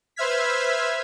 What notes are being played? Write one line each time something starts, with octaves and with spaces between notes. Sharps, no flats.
B4 C5 E5 F6 G#6 B6